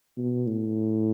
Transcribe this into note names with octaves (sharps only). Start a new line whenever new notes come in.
B2
A2